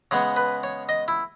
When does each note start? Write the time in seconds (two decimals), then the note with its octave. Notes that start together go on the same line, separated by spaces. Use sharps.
0.11 C#3 G#3 B3 C#5
0.36 B4
0.64 C#5
0.89 D#5
1.08 E4